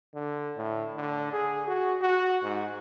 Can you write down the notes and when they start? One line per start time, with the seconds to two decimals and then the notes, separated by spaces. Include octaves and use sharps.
0.15 D3
0.57 A2
0.96 D3
1.33 G#4
1.67 F#4
2.01 F#4
2.43 G#2